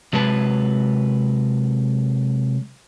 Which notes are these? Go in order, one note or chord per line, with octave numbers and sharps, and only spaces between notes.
C3 F#3 G#3 B4 A5